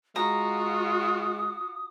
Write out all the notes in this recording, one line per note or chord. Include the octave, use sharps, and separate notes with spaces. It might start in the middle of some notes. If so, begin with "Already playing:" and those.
G#3 F4 F#4 A#5 D#6